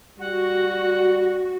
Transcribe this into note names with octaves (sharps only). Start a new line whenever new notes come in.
G3 F#4 F#5